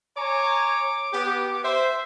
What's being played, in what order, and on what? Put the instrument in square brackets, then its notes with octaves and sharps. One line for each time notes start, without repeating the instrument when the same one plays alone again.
[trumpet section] C#5 G#5 A#5 [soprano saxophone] D6
[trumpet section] B3 G4
[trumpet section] C5 [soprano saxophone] E5